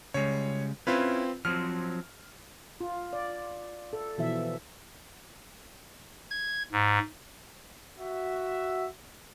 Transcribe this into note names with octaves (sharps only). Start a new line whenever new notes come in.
C#3 G3 G#3 C#5
C4 C#4 E4 F4 B4
F3 F#3 C4 F6
F4
D5
A4
B2 E3 F3 E5
G#6
G#2
F#4 E5